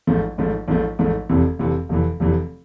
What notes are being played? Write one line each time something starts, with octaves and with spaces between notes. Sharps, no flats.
A1 G#2 F3 A3
A1 G#2 F3 A3
A1 G#2 F3 A3
A1 G#2 F3 A3
F1 F2 C3 E3
F1 F2 C3 E3
F1 F2 C3 E3
F1 F2 C3 E3